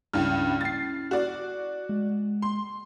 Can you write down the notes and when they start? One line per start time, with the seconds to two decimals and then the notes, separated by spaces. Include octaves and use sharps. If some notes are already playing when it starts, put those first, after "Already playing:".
0.14 C#2 G2 C#4 E4 F6
0.61 A6 C7
1.11 F#4 D5
1.89 G#3
2.42 C6